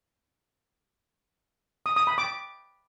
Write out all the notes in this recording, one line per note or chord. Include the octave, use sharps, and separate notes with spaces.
D#6
D#6
B5
D6